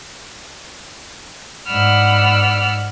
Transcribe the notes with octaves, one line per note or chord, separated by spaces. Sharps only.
G#2 D5 F#5 B5 E6 F6